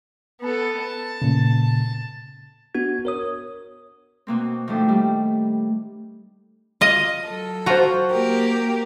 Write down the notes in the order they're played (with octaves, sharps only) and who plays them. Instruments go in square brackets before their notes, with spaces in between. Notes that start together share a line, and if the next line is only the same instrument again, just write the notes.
[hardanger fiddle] B3 A4
A5
[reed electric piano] A#2 C#3
[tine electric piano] B3 D4 F#4 G#6
A#4 C#5 D#6
[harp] B2 A#3 C4
D#3 F3 A3 D4
G3
[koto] F4 D#5
[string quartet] F#3 A4
[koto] F4 A#5 [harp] F#4 C5
[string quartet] A#3 G4 A#4